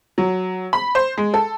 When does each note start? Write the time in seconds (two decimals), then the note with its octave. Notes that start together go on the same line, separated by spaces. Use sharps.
0.18 F#3
0.73 B5
0.95 C5
1.18 G#3
1.34 A4